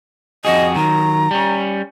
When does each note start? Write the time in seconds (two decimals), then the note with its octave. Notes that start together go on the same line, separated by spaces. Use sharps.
0.45 F2 F#4 G#4 D#5
0.76 D#3 F#3 A#5
1.31 G3 C#4